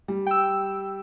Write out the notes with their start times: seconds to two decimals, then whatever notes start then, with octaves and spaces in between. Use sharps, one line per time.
0.08 G3
0.26 G5 E6